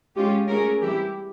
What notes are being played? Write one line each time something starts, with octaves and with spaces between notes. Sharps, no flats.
G#3 C#4 F4 G4
A3 C#4 F#4 G#4 A#4
E3 G3 C4 E4 G4